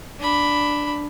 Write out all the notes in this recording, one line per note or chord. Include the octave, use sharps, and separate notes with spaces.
D4 B5